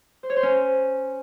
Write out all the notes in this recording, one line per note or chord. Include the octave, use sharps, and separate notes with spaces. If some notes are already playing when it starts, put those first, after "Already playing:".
C5
C#5
C5
C#4